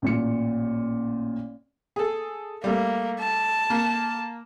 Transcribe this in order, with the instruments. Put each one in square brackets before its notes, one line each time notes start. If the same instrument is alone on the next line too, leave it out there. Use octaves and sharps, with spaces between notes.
[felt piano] A1 A#2 C#7
[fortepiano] G#4 A4
[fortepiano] G3 A3 [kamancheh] A#3
[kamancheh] A5
[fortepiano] A#3